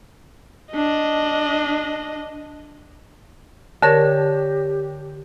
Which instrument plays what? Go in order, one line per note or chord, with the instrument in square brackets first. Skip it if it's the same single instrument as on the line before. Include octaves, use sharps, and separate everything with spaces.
[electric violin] D4 D#5
[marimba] D3 A#4 [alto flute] G4 [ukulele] C#5 A5